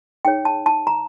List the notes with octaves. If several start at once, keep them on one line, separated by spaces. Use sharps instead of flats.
D#4 G#4 C#5 G5
A5
A5
A#5